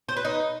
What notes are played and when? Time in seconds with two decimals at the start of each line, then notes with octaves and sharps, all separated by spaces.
0.09 C5
0.17 B4
0.25 D#4